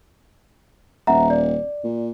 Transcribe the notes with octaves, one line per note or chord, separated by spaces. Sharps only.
D#1 E5 F#5 A#5
D5
A#2